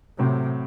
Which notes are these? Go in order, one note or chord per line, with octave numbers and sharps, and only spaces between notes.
A2 C3 F#3 C4